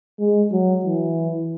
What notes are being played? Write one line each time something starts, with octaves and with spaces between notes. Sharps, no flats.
G#3
F#3
E3